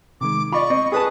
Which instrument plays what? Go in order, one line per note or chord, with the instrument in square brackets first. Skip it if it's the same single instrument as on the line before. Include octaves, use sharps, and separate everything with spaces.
[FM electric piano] C3 D#3 G#3 [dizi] D6
[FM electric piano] F4 [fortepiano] D5 D#5 B5 [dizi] C#6
[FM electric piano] C4 [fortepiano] D#5
[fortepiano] G#4 B4 A5 [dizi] D#6